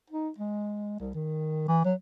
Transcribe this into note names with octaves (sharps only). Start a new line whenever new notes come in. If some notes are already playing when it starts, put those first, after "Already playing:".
D#4
G#3
C2
D#3
E3
F#3